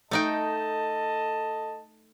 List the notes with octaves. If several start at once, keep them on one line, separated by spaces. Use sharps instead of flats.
A3 D#4 A4 D#5 G5 A5